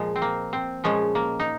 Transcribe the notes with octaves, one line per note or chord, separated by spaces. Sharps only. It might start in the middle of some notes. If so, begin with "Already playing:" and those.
Already playing: A#2 F3 G#3
C4
A#3
C4
A#2 F3 G#3 C#4
A#3
D#4